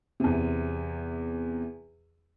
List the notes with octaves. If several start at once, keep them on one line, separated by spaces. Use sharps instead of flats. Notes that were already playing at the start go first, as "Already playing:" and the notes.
E2 C3